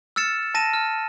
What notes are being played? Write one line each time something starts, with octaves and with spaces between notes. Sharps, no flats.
E6 F6 A6 C#7 E7
A5 A#6 D#7 E7
F6